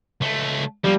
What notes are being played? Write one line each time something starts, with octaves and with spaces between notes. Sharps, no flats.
C#2 A3
F3 G3 A#3